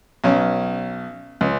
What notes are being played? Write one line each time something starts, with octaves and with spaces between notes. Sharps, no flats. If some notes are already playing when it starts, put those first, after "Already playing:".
B1 C#4
C#2